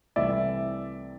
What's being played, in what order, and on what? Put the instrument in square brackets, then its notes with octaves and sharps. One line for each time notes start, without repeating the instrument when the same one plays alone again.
[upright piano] C2 C3 E3 A3 D5 E5